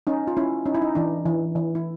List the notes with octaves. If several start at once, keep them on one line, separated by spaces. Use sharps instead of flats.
C#4 D#4
F4
C#4 E4
C#4 D#4
E4
D#4
E3 D4
E3
E3
E4